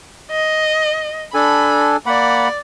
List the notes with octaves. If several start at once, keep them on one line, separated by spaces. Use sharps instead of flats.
D#5
D4 A4 G#5 B5
A#3 D5 F#5 B5